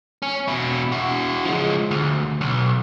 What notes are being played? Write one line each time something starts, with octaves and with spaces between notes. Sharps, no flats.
C#4
B2 E4
E4 F#4
F3 G#3
D2
B1